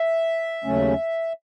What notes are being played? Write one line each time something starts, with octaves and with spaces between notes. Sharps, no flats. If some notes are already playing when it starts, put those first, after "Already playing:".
Already playing: E5
D#2 C#3 F#3 A3 C#4